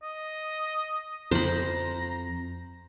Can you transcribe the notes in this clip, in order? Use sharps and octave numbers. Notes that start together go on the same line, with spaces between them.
D#5
F2 C5 A#5 B5